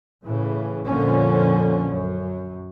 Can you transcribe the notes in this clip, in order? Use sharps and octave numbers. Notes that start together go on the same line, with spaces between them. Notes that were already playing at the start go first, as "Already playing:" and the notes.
A2 C#3 E3
A#1 F2 D3 F3 A#3 C#4
F#2